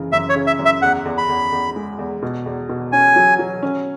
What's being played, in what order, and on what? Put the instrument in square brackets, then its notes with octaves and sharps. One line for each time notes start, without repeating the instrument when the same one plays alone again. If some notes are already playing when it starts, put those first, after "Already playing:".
Already playing: [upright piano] F#1 C#3 E3
[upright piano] F#2 [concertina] E5
[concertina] C#5
[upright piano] C#3
[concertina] E5
[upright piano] F#2
[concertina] E5
[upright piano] E2 [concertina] F#5
[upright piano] E2
[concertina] B5
[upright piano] E2
E2
G#3
E2
B2
E2
B2
[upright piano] C#4 [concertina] G#5
[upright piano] F#3
F#3
C#4